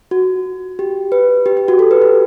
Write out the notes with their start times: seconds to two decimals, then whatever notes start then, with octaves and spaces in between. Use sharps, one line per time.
0.11 F#4
0.79 G4
1.12 B4
1.46 G4
1.57 G4
1.68 F#4
1.79 A4
1.91 B4
2.02 G4